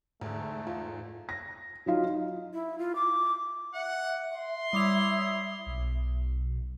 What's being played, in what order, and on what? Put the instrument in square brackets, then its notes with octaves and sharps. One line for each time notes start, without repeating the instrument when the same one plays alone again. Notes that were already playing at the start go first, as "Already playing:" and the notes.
[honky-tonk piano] E2 D3 [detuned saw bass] G#2 [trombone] A3
[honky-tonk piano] E2 [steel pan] F4
[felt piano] A#6
F#3 D#4 F4
D#4
[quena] E4
F4
D6
[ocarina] E5 [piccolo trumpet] F#5
[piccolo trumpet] C6
[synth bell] G3 D6 F7 [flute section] E4 C#5 D#6
[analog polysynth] B1